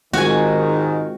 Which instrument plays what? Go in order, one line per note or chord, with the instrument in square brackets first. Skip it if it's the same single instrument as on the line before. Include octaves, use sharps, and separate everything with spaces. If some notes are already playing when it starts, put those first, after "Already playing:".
[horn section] G#2 D#3 [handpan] C3 G#3 F4 [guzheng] F#4 G#5